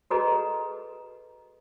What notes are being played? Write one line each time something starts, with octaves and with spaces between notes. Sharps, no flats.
F#4 G#4 A4 B4 D#5 A#5